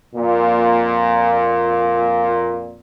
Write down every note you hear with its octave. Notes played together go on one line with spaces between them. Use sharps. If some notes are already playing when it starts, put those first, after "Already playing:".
F2 A#2